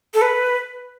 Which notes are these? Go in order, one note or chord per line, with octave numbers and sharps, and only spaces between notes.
A4
B4